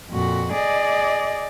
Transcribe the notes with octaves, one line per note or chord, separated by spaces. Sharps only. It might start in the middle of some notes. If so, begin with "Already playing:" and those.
F2 A#2 F#4
G#4 D5 D#5